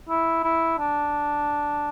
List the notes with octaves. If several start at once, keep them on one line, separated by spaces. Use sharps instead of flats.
E4
E4
D4